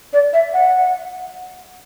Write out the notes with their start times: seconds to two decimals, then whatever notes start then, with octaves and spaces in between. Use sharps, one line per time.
0.13 D5
0.33 E5
0.53 F#5